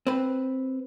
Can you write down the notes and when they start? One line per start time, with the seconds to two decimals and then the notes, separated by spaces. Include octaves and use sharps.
0.07 C4 B4